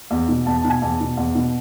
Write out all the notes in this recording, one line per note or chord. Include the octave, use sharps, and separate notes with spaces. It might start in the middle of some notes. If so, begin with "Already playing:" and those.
E2
B2
E2 A5
A5
B2
G#5
E2 A5
B2
E2
B2